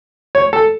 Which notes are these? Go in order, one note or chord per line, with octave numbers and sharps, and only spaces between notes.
C#5
A4